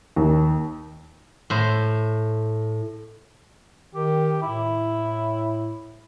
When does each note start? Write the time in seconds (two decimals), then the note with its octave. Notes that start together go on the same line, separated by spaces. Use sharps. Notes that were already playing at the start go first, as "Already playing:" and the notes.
0.16 D#2
1.50 A2 C5
3.95 D#3 G4
4.42 A2 E4